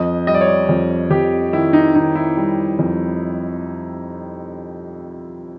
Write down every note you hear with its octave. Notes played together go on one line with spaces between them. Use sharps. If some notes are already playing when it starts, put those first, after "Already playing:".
Already playing: F2 D#5
G3 D#5
D5
C#5
D5
F2
F2 G4
D#3 E4
D#4
D#3 D#4
E4
G3
F2